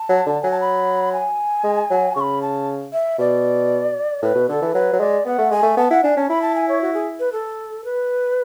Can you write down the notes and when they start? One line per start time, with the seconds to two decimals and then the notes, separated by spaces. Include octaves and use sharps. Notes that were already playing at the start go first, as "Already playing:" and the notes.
Already playing: A5
0.09 F#3
0.27 D3
0.42 F#3 G#5
0.51 A5
0.61 B5
1.13 G#5
1.64 G#3
1.91 F#3
2.16 C#3 B5 C#6
2.42 A5
2.93 E5
3.19 B2 D5
4.22 A2 B4
4.35 B2
4.49 D3 A4
4.62 E3
4.74 F#3 B4
4.93 F#3
5.00 G#3 D5
5.26 B3 F#5
5.38 A3
5.51 G#3 G#5
5.63 A3
5.77 B3 A5
5.91 E4 F#5
6.04 D4 G#5
6.16 C#4 A5
6.29 E4 B5
6.42 A5
6.56 G#5
6.68 C#5
6.81 F#4
6.94 G#4
7.20 B4
7.32 A4
7.84 B4